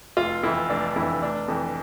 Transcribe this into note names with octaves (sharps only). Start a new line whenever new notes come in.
F1 F4
F2 E3 E4
F1 D4
F2 E3 E4
F1 D4
F2 E3